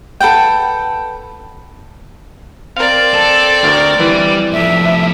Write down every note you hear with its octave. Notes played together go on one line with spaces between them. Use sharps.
A4 B4 F#5 G5
C4 A#4 D5 F5
A4
D2 A#4
E3 G3
F2 A2 E5